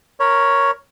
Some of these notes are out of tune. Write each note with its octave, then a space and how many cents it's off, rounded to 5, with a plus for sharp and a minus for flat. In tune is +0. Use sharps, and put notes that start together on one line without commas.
A#4 +0 C#5 +0 B5 -30